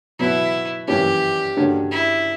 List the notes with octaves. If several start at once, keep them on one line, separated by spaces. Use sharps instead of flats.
B2 F#3 B3 E4 F#4
F#2 E3 G3 A#3 C#4 G4
G2 D3 A#3 C#4 F#4
E4